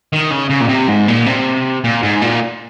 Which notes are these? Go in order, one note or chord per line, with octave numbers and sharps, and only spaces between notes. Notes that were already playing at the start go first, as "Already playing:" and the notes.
D#3
C#3
C#3
A#2
C3
G#2
A#2
C3
A#2
G#2
A#2